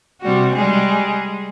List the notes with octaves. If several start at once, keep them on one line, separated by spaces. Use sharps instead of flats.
C3 G3 F#4
G3 G#3 G#4